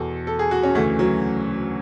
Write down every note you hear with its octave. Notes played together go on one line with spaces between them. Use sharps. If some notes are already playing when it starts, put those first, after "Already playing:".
Already playing: E2 B2 A4
A4
G#4
F#4
C#4
D2 C#3 E3 A3
F#3